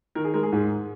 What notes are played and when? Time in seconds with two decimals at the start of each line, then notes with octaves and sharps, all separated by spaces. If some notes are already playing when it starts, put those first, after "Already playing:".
0.15 D#3 A#4
0.24 G#4
0.34 G#3 A#4
0.43 G#4
0.52 G#2